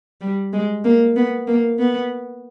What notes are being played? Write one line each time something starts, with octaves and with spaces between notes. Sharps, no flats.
G3
G#3
A#3
B3
A#3
B3